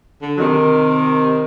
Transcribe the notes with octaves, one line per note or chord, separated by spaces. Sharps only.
D3
F#3
C3 D#3